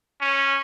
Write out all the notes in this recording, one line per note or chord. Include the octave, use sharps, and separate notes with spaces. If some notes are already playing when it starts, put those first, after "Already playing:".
C#4